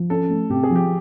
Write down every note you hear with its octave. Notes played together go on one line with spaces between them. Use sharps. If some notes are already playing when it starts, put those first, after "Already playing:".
Already playing: F3
C#4 A4
A3
C3 G4
G#4
F3
G4